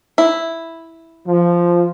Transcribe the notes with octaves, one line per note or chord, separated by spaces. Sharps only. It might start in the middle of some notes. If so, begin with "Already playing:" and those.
E4
F3